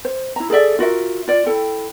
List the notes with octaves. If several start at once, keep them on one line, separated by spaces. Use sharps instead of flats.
C5
E4 A#5
G#4 A4 D5 E5
F4 F#4 A#4 E5
F4 D5
E4 A4 G5